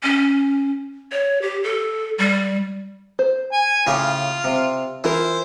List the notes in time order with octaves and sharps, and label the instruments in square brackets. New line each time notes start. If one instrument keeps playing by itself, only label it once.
[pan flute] C#4
C#5
G4
A4
G3
[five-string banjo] C5
[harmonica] G#5
[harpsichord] A2 C#3 G4 [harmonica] F4
[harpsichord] C3
[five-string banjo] E3 F4 A#4 [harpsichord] E4 [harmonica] C5